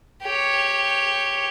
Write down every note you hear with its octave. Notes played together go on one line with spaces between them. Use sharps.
G4 C#5